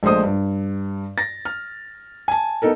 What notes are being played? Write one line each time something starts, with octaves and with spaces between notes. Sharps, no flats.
A#1 G#3 A3 C5 D#6
G2
A6 A#6
F6
G#5 A5
B3 D#4 A4 A#4